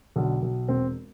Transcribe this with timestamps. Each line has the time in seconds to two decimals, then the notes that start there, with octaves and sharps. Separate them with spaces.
0.16 B1 D3 D4
0.42 B1
0.68 E1 C4